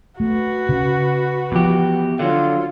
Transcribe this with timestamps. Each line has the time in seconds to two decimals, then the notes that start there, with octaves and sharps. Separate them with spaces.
0.20 A3 F#4 B4
0.69 C#3
1.52 E2 F3 G4
2.19 D3 F#3 F4